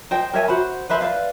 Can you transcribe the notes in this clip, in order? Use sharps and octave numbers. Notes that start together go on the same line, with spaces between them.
C5 D#5 G5
A#4 C#5 E5 G#5
F#4 C5 B5
B4 C5 E5 B5
B4 D5 F5